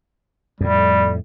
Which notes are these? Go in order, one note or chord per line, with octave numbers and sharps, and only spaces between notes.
F2 A2 G3